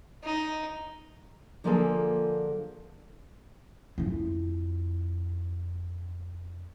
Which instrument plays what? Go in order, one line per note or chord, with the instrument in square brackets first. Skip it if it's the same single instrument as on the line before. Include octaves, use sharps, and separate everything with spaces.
[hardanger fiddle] D#4
[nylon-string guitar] D3 F3 A#3 F4 G#4 A4
[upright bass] F2 E4